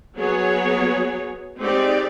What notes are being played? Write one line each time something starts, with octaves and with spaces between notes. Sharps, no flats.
F#3 B3 G#4 C#5
G#3 C4 D#4 G4 D5